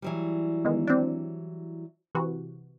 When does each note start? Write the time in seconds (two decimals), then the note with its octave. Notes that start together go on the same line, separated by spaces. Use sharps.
0.02 E3 F#3 G3
0.65 B2 D#3 G#3
0.87 C4 D4
2.15 C3 E3 F#4